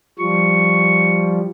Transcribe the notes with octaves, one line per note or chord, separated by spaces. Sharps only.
F3 G3 C#6